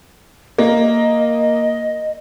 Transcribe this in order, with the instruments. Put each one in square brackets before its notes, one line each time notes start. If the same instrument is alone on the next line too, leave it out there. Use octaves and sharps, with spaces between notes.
[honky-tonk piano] A#3 [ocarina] D#5